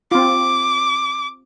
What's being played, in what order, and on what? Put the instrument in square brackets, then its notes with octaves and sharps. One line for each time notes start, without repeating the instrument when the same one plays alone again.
[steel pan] C4 F4 [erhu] D6